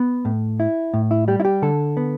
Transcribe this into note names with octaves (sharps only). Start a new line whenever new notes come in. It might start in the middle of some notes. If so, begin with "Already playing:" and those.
Already playing: B3
A2
E4
A2
E4
G3 G4
E4
G4
D3 A4
B3